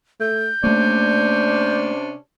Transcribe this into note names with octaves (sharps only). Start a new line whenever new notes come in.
A3 G6
C3 A3 A#3 C#4 D4 D5